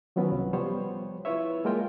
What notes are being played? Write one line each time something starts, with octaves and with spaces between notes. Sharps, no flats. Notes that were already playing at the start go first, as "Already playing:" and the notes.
D#3 F3 F#3 B3 C#4
C2
F3 G3 B3 C5 C#5
E4 F4 B4 C#5 E5
G#3 A#3 F4 A#4 G5